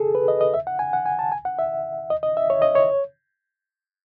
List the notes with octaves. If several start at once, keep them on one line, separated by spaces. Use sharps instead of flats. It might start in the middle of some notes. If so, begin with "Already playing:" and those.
Already playing: G#4 A4
B4
D#5
D#5
E5
F#5
G#5
F#5
G#5
A5
G#5
F#5
E5
D#5
D#5
E5
C#5
D#5
C#5